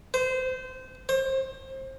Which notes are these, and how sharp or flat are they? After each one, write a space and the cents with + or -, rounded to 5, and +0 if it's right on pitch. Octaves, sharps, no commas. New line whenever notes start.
C5 -25
C5 +30